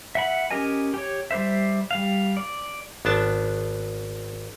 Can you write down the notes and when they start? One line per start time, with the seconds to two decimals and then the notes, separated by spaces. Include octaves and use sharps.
0.15 E5 F#5 B5
0.51 C#4 G4 A#4 D#5 G#5
0.94 G4 C#5
1.31 G3 G4 C5 E5
1.91 G3 F5
2.37 D5
3.05 G#1 B3 D4 A5